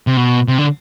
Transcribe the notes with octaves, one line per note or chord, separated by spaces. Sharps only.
C3
B2
C3
D3